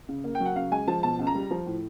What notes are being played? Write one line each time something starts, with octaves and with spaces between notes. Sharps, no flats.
C#3
A#3
G5
F#3 F#5
C#3 F5
G#3 G#5
F3 A5
B2 A5
C#2
A#5
G3
F3
A2